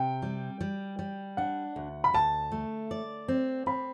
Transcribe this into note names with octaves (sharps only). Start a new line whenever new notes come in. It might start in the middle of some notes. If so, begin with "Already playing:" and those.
Already playing: C3 G5
G3
G3
G3
D4 F#5
D2
B5
D2 A5
A3
D5
C4
C4 B5